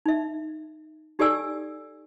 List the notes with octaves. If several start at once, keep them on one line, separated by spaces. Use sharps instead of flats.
D#4 E5
D#4 G4 A4 D5 G#5 E6